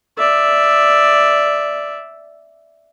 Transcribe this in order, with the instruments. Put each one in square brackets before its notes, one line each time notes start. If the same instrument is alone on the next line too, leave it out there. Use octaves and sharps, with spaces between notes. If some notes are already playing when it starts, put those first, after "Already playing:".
[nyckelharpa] D5 E5